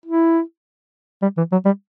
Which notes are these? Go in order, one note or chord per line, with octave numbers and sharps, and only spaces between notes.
E4
G3
E3
F#3
G3